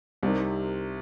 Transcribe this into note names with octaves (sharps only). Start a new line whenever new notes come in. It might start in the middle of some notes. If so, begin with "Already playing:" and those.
C2 C3 G3 C4 D#4 A#4